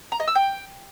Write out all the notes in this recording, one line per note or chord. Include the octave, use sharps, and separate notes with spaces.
A#5
D#5
E6
G5